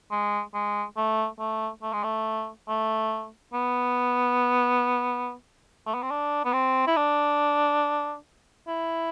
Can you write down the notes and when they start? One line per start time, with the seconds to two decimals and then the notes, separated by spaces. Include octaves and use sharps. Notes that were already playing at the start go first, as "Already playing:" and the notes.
0.11 G#3
0.54 G#3
0.97 A3
1.39 A3
1.82 A3
1.93 G#3
2.04 A3
2.68 A3
3.54 B3
5.87 A3
5.95 B3
6.02 C4
6.11 D4
6.45 B3
6.53 C4
6.87 E4
6.96 D4
8.68 E4